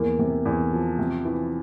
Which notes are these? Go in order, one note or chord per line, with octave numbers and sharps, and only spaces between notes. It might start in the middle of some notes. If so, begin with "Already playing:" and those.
Already playing: E2 A#3
C3
E2
F3
C3
E3